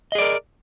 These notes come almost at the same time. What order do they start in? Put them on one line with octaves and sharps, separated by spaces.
D#5 G#4 D5 A#4